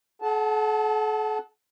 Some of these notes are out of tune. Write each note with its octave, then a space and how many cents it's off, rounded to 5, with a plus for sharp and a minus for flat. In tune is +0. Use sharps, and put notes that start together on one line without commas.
A4 -45 F#5 +0 A5 -10